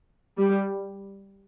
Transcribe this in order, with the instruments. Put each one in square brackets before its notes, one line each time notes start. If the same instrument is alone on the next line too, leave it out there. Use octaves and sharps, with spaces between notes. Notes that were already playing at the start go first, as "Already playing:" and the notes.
[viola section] G3